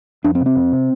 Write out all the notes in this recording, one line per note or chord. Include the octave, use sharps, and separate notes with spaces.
F2 D4
C4
C3
C4
F2
C3